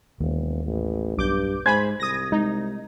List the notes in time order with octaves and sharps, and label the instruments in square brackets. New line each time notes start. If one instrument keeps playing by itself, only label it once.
[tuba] E1 [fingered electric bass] D#2 D#3 A#3
[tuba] A1
[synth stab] B1 D6 G6 [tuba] G2
[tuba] G#2 [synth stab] C5 G#5 B5 [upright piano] G#6
[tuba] C2 [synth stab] D#6 A#6
[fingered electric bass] G#3 [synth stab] D#4